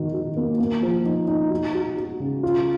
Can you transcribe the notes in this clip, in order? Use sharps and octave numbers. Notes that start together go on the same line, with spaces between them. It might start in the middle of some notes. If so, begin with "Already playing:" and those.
Already playing: D#3 F#4
F#4
A#3
A#3
F3
D#4
D#4
F#4
F#4
F#4
C#3
F4